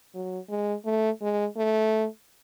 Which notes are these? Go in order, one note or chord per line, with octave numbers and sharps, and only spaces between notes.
F#3
G#3
A3
G#3
A3